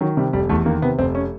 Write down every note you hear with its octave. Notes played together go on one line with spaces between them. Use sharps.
D#3 F#3
C3 G3
F1 G3
E2 A3
D#3 A#3
C3 B3
F1 C4
C#4